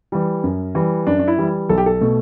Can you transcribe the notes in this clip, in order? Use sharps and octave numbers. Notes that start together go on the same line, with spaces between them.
E3 G3
F#2
E3 G3
F#2 D4
D4
E4
E3 G3
B1 A4
G4
A4
B2 A3